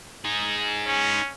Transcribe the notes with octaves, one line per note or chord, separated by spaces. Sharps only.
D#4 G#4
C#4